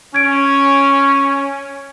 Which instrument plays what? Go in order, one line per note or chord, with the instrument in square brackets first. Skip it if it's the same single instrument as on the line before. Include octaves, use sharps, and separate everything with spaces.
[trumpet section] C#4 [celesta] G#6 D7